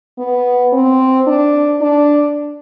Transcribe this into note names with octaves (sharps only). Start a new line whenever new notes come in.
B3
C4
D4
D4